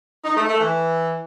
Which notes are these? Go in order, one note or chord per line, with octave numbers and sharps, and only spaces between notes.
D#4
A3
A3
E3